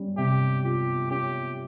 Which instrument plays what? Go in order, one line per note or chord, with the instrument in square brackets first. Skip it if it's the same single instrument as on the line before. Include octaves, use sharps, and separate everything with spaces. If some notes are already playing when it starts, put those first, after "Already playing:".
Already playing: [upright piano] G3 C#4
[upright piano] C3 [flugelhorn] G4
[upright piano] F4 [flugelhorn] G4
[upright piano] C#4 [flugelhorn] G4